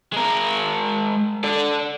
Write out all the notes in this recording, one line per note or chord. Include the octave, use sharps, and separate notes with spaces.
G#3 A#4
A4 D5